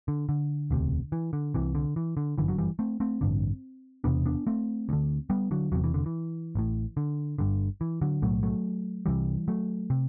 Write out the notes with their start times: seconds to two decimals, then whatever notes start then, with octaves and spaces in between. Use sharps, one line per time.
0.08 D3
0.29 D3
0.71 E1 D2 C3
1.12 E3
1.33 D3
1.54 C2 C3 E3
1.75 D3
1.96 E3
2.17 D3
2.37 G1 F#2 D3 E3
2.48 D3 F#3
2.58 E3 G3
2.79 A3 C4
3.00 A3 C4
3.21 A1 G2 D3
4.04 E1 E2 C3 B3 D4
4.26 B3 D4
4.47 A3 C4
4.89 D2 D3
5.30 G3 B3
5.51 D3 F#3
5.72 E1 E2 C3 F#3
5.84 E3
5.94 D3
6.06 E3
6.55 A1 A2
6.97 D3
7.39 G1 G2 D3
7.81 E3
8.01 D3 F#3
8.22 B1 A2 F#3 A3
8.43 F#3 A3
9.06 C2 C3 E3 G3
9.48 F#3 A3
9.90 C3